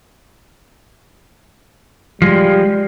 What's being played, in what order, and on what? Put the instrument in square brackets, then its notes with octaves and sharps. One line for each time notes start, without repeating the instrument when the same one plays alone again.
[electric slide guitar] F3 G#3 [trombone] G3